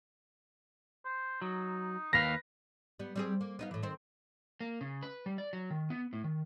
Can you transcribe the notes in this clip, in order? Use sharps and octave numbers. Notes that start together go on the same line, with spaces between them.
C5
F#3 D#4
D#2 B4 F5 A#6
G3 B3
G3 C4 G#4
A#3
B3 D#4 F5
A2 E3
D#3 C4
A#3
C#3
B4
G3
D5
F#3
D#3
B3
A2
D#3